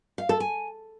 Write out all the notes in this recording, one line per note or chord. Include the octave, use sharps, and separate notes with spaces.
F5
A4
G#5